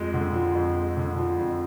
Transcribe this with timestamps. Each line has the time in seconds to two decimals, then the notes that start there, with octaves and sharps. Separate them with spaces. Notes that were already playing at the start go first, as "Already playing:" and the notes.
Already playing: F2 F3 G#3
0.14 D3
0.34 F3
0.55 F2
0.75 G#3
0.97 D3
1.17 F3
1.38 F2